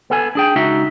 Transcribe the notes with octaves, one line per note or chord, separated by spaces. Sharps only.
B3 A4 G#5
D4 G#4 G5
C#2 D#4 F#4 E5